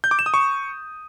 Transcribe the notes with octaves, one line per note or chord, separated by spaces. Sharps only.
G6
D6
E7
D#6
C#6